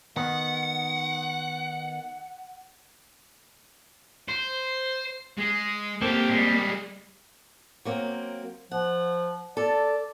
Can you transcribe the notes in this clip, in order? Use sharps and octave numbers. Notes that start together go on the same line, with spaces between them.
D#3 B3 D#4 F#5
C5
G#3
A#3 C4 G4 A4
G3 G#3
F#3 A#3 C4
F3 F#5
A4 D5 A5